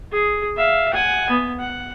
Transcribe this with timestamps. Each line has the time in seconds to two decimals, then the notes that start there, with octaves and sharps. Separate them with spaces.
0.12 G#4
0.57 E5 F5
0.93 F#5 G#5
1.30 B3
1.60 F#5